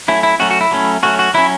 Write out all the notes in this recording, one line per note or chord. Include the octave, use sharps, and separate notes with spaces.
F#3 A3 C#4 E4
E4
F#3 A3 C#4 F#4
F#4
E4
F#3 A3 C#4
F#3 A3 C#4 F#4
F#4
F#3 C#4 E4